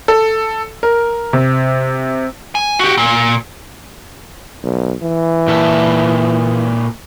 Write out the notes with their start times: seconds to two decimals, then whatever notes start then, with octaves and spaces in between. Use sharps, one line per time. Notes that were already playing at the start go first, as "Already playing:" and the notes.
0.08 A4
0.83 A#4
1.33 C3
2.55 G#5
2.79 F#4 G4
2.97 A#2
4.64 B1
5.03 E3
5.47 A#2 E4 A4